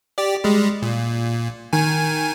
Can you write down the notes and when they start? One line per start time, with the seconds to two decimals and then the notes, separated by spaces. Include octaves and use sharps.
0.18 G4 D5
0.44 G3 G#3
0.82 A#2
1.73 D#3 G#5